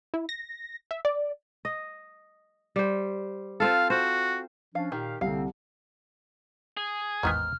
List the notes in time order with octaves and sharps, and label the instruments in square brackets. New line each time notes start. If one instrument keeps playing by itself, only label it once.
[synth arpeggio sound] E4
A#6
E5
D5
[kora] D#5
G3 C5
[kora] C4 F4 A4 [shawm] F5
[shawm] F#4 [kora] C5
[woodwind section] F3 C#4 D4 [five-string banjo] F5
[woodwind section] A#2 G4 F5 [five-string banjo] D#3
[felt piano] C2 [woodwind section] D3 A#3 C4 [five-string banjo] F5
[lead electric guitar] G#4
[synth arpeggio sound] A1 E2 G6 [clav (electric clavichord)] G#2 D#3 B3 [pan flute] F6